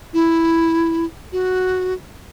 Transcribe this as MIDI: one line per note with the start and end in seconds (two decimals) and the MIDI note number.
0.14 1.05 64
1.32 1.94 66